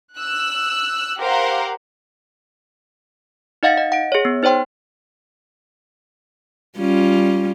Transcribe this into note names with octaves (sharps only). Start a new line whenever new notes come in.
E6 F#6
G4 A#4 C5 F5 F#5
D#4 D#5 F5 F#5 A6 C#7
D#5
F#5 D7
G#4 C#5
B3
D#4 C5 C#5 G5 C6
G3 C#4 F4